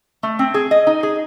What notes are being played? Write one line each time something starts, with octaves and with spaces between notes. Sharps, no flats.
A3
C4
G#4
D#5
D#4
G#4